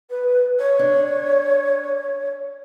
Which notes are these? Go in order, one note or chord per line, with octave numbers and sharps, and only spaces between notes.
B4
C#5
D4